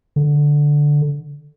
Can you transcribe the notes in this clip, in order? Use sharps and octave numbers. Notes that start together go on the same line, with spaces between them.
D3